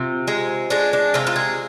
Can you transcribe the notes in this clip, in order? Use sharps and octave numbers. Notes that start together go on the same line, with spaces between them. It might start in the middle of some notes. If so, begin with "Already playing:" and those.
Already playing: C3 F4
G#3
G#3 D4
D4
C3 F4
F4
G#4